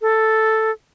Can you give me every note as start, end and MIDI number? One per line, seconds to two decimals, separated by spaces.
0.02 0.71 69